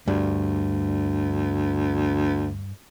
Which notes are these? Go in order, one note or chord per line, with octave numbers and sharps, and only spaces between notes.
D2 G2